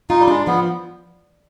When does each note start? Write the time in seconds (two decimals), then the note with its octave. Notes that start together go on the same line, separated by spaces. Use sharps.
0.10 D#4 F4
0.20 G3
0.28 G#3 D4
0.47 F3 B3